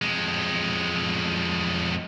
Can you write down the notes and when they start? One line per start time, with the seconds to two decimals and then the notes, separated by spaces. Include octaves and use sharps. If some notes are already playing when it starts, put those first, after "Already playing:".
0.02 F2 G#3